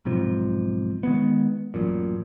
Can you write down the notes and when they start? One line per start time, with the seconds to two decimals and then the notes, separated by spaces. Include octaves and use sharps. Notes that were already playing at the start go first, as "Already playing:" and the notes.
0.05 B1 G#2 C3 F3
1.03 D#3 G#3 B3
1.74 A1 F#2 A#2